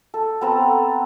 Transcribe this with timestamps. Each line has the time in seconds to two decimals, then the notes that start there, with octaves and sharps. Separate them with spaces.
0.14 A4
0.41 B3 C4 A4 A#5